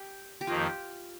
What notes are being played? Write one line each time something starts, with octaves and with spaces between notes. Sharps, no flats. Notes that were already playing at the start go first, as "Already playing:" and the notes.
Already playing: G4
G4
F2 D#3 A#3 F4